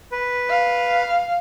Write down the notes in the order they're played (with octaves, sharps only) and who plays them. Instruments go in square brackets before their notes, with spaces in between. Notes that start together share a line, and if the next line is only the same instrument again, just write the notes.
[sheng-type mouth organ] B4
[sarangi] F5